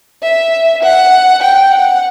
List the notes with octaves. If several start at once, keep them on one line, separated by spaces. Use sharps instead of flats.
E5
F#5
G5
F#5